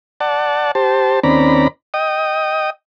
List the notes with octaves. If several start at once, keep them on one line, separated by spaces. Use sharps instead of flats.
D5 F#5 A5
G4 C5 A5
D#2 C4 C#4 D5 A#5 B5
D#5 G5 D#6